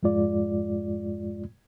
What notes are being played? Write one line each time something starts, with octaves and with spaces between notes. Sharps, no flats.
F2 G#2 G#3 F4 D5